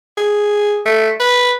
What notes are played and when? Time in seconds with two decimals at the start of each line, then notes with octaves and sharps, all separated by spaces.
0.18 G#4
0.86 A3
1.20 B4